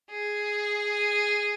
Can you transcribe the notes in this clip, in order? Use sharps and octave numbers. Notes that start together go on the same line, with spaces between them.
G#4